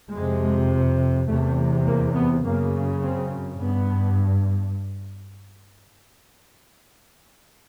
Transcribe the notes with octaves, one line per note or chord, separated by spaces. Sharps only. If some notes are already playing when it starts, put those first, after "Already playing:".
F2 C3 G#3
E2 C3 A3
A#3
B3
F#2 C#3 A#3
C4
G2 B3